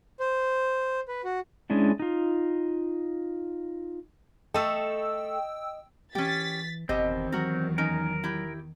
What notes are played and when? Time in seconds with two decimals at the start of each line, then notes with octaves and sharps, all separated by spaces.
0.20 C5
1.08 B4
1.24 F#4
1.70 G#3 C#4 D4 E4
2.00 D#4 F4
4.54 A3 A4 D#5 G5 E6
6.15 E3 C#4 G4 A6 B6
6.89 F#1 E2 B2 D#3 C4 G4 D#5
7.32 F#3 F#4 A#4
7.78 C#4 D#4 A#4
8.23 E4 G4